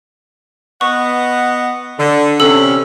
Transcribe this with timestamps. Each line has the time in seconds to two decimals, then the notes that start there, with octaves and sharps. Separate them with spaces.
0.81 B3 D#5 F#5 C#6
1.99 D3
2.40 C3 E3 C#4 A4 E6